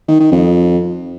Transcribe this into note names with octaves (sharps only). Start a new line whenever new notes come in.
D#3
D#3
F2